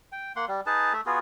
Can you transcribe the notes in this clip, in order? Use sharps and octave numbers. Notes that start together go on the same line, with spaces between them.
G5
A#3 F#5 C6
G3
D#4 G#4 B4 A5
A3 E5
B3 F4 F#4 G#4